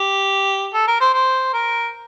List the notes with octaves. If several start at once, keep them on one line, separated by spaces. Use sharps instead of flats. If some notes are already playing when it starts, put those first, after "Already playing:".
Already playing: G4
A4
A#4
C5
C5
A#4